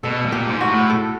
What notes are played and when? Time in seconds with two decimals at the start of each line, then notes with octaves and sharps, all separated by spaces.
0.03 B2 A4
0.25 A#2
0.32 G4
0.47 G#2
0.61 F#4
0.67 A2
0.90 A4